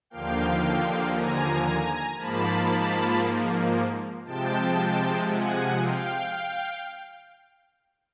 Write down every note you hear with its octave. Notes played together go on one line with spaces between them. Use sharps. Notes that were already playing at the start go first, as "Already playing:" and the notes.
D#2 D3 F3 A#3 F5 G5
G#5 A#5
G#2 F3 A#3 A5 B5
A5 B5
C3 F3 G#3 G5 A5
F#5 G#5
F5 G5